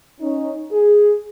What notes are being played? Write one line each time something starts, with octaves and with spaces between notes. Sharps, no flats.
C#4 D#4
G#4